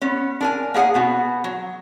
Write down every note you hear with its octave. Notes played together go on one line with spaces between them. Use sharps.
B3 C#4
D4 A#4 G#5
A#3 B3 G#4 F#5 G#5
B2 B3 F#4
F#3